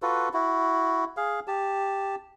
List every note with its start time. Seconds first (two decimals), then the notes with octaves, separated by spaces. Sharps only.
0.02 F4 F#4 A4 B4
0.33 E4 F#4
1.17 G#4 F5
1.48 G4 A5